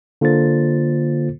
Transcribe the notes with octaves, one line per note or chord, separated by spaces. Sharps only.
D3 A#3 F4 A4 C5 A6